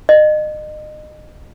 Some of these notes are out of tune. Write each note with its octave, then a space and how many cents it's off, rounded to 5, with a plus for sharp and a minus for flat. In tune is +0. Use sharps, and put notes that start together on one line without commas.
D#5 -30